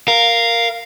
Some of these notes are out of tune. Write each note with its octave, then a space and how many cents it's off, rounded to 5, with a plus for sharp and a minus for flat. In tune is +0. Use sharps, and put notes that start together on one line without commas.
A#4 +0 F5 +0